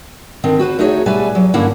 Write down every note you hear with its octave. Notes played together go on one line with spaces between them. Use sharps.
D3 D#3 C4
F#4 B4 C5
A3 D#4 F#4 G#4 B4 C#5
B2 G3 B4 E5 G#5
F#3
G2 D3 A#3 C#4 E4 F#5